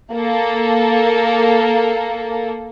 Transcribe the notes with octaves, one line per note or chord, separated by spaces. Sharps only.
A#3 A4